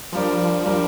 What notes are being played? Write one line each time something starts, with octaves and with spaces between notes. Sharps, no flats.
F3 G3 D4 A#4 D5
G3 D4 A#4 D5